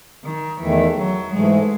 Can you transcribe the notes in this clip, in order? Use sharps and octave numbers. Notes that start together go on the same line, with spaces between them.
D#3
E2 D#3 E3 A3
F#3
G#2 E3 G#3 A3